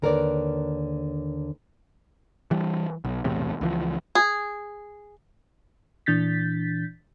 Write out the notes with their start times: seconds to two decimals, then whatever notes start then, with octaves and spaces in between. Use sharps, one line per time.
0.02 D#2 D3 A#4 B4 C#5 D5
2.51 E3 G3
3.05 B1
3.24 B1 E2 A2 C3
3.61 C#2 E3 F3
4.15 G#4
6.06 A#2 E3 D4 G6 A6 B6